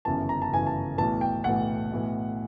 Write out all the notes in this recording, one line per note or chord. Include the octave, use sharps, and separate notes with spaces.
G1 F#2 C#3 E3 A5
A#5
A5
G1 F#2 C#3 E3 G#5
A5
B1 A2 E3 A5
G5
B1 A2 E3 F#5
B1 A2 E3